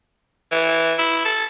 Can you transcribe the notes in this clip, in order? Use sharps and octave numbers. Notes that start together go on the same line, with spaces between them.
E3
E4
A4